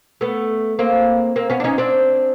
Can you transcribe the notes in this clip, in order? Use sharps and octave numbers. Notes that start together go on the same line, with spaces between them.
A3 B3
A#3 C4
A#3 C4
B3 C#4
D4
C#4 D#4
C4 D4